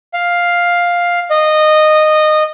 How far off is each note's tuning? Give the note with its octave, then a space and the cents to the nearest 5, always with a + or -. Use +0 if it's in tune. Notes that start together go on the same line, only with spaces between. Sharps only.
F5 +5
D#5 -15